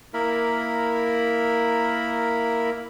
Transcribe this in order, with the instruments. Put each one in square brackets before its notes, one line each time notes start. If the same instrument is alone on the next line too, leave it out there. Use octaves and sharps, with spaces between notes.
[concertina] A#3 E4 A#4 B5